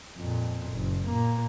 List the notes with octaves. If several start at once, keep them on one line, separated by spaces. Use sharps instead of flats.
F2 A#2
F#1
A#2 A#3